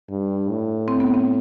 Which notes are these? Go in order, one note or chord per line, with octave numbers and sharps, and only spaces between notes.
G2
A2
C4
B3
C4